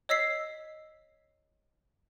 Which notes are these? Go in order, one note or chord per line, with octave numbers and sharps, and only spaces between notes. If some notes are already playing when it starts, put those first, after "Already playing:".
C#5 D#5 E6 B6 C7